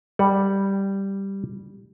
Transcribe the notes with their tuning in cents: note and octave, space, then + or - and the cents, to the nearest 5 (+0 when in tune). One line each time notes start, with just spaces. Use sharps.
G3 +0 F#5 +0